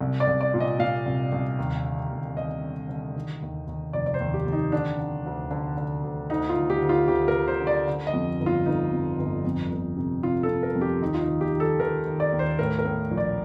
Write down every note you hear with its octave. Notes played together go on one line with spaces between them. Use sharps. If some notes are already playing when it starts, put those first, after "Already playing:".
C2
D5
C2
D5
A#2
D#5
A#2 F5
C2
C2
D#2
D3
D#2
D#2 D#5
D3
D3
D#3
D#2
D#2
F1 D5
D5
C5
D#2
G4
D#2
D#4
D3 D4
D3
D2
D3
D3
D2
D2 D#4
F4
D2
G4
D2
F4
D2 G4
A#4
D2
C5
D3
D5
D3
D#5
F2
G1
F4
G1 D#4
F2
G1
F2
G1
C3
C3 F4
A4
C3
A#4
F2
G4
D#2 D#4
F4
D#4
D#3
G4
D#3
A4
D#3 A#4
D#3
D5
D#2
C5
A2 A#4
A#4
A2
A#1
D5